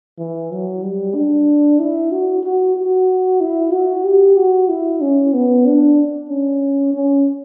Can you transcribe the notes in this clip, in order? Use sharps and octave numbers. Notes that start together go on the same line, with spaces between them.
E3
F#3
G3
D4
E4
F#4
F#4
F#4
E4
F#4
G4
F#4
E4
C#4
B3
D4
C#4
C#4